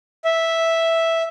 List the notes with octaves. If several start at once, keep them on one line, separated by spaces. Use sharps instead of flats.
E5